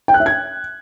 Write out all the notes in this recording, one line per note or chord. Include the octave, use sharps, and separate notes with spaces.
G5
F#6
E5
G#6